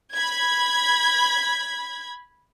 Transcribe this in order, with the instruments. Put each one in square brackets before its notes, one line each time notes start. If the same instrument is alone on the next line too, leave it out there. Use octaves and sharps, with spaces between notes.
[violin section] B5 G#6